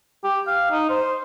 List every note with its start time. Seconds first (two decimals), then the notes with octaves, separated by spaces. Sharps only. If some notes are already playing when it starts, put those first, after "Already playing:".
0.24 G4
0.47 F5
0.71 D#4
0.89 C5